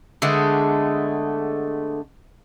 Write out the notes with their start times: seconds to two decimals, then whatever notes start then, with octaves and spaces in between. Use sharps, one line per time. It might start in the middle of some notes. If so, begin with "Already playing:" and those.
0.22 D3 G#3 A3 B3